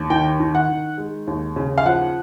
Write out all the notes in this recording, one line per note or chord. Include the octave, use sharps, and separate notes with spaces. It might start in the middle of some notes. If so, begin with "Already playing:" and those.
Already playing: D#2
D#3 G5
D#3
F#5
D#3
G#3
D#2
C#3
F5
F3 F#5